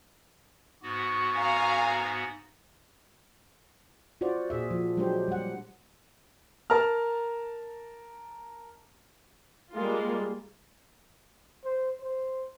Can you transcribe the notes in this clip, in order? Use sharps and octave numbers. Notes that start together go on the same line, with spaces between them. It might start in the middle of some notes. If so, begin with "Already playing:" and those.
G#2 B3 F#4 C#6
F5 G#5 A#5
F4 F#4 C5 D5
A#2 G#4 E5
F3
F#3 G#3 D4 G4 C5
G3 F#5
A#4 A5 A#5 F6
G3 G#3 A#3 F4
C5
C5